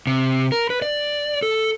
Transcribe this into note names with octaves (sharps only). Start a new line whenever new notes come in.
C3
A#4
B4
D5
A4